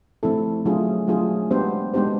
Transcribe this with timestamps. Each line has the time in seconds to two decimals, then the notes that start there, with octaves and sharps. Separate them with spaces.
0.23 F3 A3 C4 E4 A4
0.65 F#3 A3 D4 F4 G#4
1.07 F#3 A3 D4 F4 G#4
1.51 G#3 B3 D4 G4 C5
1.94 G#3 B3 D4 G4 C5